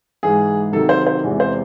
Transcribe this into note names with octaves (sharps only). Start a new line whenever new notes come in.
G#2 E3 G#3 G#4
C3 D#3 F#3 A4
C5
C5
E2 C3 E3 G#3
C5